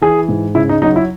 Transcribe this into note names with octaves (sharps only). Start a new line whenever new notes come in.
E3 G#4
G#2
C#3 E4
D#4
F#3 D#4
E4